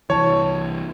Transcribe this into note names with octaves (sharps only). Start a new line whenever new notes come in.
C2 E3 C#5 A5